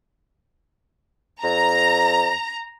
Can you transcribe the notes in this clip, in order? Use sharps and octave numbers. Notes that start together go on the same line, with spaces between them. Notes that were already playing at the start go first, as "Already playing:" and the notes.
F2 A#5